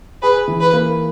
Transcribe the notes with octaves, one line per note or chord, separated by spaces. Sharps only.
G#4 B4
E3
B4
A#3